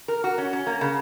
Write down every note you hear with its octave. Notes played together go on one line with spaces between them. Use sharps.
A#4
F#4
C#4
C#4
A#3
C#3